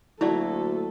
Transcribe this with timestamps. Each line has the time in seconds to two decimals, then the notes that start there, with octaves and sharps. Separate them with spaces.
0.21 D2 F#3 A3 A#3 E4 A4 D5